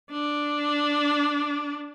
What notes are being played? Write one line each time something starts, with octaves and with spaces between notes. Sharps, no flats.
D4